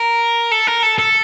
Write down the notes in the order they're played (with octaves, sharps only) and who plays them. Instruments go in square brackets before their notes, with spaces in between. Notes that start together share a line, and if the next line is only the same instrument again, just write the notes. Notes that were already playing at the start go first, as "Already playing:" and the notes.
Already playing: [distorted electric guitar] A#4
A4
A#4
A4
A4